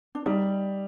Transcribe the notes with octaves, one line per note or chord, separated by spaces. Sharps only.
D4
G3 D#4